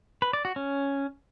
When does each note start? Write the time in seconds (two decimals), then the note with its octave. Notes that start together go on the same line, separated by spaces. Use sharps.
0.22 B4
0.33 D5
0.45 F#4
0.56 C#4